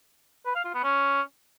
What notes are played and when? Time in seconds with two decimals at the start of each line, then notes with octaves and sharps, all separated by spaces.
0.46 B4
0.55 F5
0.65 F4
0.74 B3
0.84 C#4